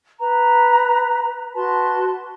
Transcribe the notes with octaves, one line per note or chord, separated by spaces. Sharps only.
B4 A#5
F#4 B4 A5 C6